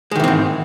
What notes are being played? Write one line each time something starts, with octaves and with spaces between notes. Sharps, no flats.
G#2 D#3 E3 G#3 C4